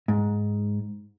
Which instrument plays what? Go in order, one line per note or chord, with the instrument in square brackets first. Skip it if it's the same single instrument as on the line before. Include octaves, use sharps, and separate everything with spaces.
[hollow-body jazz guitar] G#2